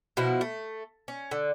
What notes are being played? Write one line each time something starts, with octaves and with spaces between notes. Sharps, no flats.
B2 F3 E4
A3
C#4
D3